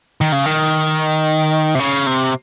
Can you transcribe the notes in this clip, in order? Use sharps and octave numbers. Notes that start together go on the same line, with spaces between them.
D#3
C#3
D#3
C3
C#3
C3